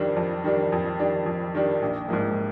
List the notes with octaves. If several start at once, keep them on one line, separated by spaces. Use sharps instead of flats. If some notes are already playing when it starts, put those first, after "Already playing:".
Already playing: F2 D#3 G3 D4
F2
D#3 G3 D4
F2
D#3 G3 D4
F2
D#3 G3 D4
A#1
G#2 F3 A#3